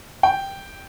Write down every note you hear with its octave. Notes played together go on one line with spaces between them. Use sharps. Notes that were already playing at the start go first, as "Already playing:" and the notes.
G5